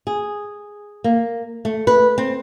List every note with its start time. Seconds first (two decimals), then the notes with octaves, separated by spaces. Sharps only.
0.07 G#4
1.04 A#3
1.65 A3
1.87 B4
2.18 C4